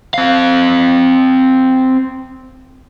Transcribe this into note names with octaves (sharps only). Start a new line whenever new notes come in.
C4 F5